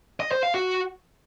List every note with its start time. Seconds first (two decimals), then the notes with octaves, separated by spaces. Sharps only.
0.20 D#5
0.31 C5
0.43 F5
0.54 F#4